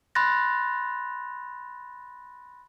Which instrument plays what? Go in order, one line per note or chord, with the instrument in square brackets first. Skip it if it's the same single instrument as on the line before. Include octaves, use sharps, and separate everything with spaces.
[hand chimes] B5 C6 F#6 A6 A#6